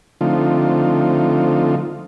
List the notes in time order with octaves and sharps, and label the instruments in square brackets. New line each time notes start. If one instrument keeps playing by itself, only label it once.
[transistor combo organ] D3 F3 A3 C4 D#4 F4